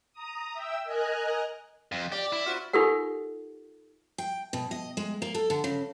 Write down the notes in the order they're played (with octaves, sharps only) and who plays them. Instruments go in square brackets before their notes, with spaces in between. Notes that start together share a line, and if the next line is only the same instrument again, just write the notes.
[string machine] A#5 D#6
E5 G5 E6
A#4 D#5 G#5 A#5 F#6
[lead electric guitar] F2
[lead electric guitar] G4 [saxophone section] D5
[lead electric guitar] E4
[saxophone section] C4 F4 F#4
[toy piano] D#4 F4 G4 A4 A#4 F#5
[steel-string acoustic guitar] G5
B2
D#5
G#3
A#3
A4
D3
C#3